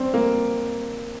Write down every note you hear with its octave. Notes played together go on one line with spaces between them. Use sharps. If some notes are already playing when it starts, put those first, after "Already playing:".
Already playing: C4 D4
A#3